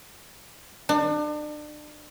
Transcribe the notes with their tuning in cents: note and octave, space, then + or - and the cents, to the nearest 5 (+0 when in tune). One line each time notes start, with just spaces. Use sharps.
D4 +35